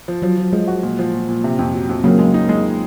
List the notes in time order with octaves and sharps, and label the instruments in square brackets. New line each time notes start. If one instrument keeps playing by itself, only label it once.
[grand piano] F3
[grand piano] F3 [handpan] F#3
[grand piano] F3
[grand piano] F3 [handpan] G#3
[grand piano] F#4
A#2
F3
A#2
A#2
C3
F2
F#3
F2
[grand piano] C#3 [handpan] F#3 A#3
[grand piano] G#3
D#4
G#3